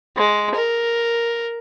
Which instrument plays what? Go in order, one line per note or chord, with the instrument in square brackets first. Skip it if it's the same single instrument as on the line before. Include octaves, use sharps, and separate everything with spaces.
[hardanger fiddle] G#3
A#4